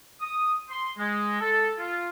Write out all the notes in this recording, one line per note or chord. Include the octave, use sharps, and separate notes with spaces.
D#6
C6
G#3
A4
F4